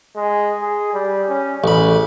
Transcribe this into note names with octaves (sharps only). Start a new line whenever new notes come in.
G#3
G#4
G3
C#4
A1 C#3 B5